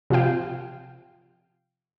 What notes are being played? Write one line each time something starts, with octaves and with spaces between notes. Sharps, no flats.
C3 F3 F4 F5 G5